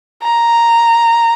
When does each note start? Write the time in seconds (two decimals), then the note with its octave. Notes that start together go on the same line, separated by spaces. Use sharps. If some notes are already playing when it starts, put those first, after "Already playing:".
0.23 A#5